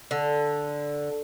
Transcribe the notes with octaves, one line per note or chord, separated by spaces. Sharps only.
D3